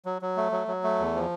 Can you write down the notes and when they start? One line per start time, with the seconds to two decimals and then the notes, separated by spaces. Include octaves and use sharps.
0.05 F#3
0.22 F#3
0.37 A3
0.52 F#3
0.68 F#3
0.84 A3
1.00 E2
1.15 F3